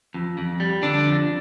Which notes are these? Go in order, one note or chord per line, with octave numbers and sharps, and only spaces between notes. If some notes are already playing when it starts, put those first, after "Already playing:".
F2
F2
G3
D3 D4
F2